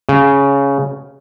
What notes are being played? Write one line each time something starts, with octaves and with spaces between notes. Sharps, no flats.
C#3